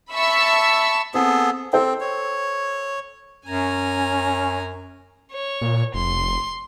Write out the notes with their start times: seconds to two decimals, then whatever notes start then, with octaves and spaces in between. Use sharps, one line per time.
0.13 E5 A5 B5 C#6 E6
1.14 B3 C4 G#4 A4
1.73 C4 A4 C5 G5
2.00 C#5
3.46 F#2 C#4 G#5 A#5
5.32 C#5
5.62 A#2
5.94 F1 C6